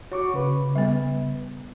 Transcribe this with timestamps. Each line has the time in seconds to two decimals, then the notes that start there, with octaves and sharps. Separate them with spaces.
0.12 F#4 C#5 C#6 D6
0.34 C#3 B4
0.76 G3 B3